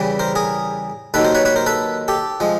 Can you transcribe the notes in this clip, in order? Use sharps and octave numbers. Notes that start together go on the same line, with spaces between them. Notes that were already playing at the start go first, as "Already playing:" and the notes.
Already playing: E2 C#3 E3 G3
A#4 C5
G#4 A#4
D#2 D#3 F#3 A4 B4
A#4 C5
B4 C#5
B4 C#5
A#4 C5
A4 B4
G4 A4
F3 G#3